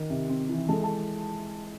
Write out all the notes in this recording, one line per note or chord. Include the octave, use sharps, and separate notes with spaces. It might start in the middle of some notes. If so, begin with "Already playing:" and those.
Already playing: D#3
C3
C4
E3
G#3 A4 A5
A4 A5